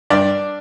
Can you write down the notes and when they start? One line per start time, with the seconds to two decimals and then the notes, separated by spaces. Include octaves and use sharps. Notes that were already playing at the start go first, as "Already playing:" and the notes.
0.10 G2 D4 D5